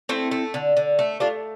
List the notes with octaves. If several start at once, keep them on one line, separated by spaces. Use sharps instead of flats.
A3 C4 E4
A3
D3
D3
A3
A3 D4 F4